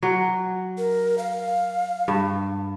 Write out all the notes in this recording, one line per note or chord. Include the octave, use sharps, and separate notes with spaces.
F#3
A#4
F5
G2